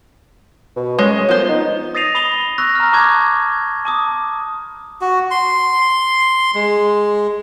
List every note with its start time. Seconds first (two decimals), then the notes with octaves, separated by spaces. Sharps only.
0.76 B2
0.99 G#3 C#4
1.29 F3 B3 C5
1.49 D#4
1.95 D#6 A6 A#6 C7 D#7 F7
2.15 B5 D#6 F7 G7
2.58 C#6 E6 F#6 A#6
2.75 A#5 F6
2.93 A5 C#6 D6 F#6 G#6
3.85 A5 D6 D#6
5.01 F#4
5.31 C6
6.55 G#3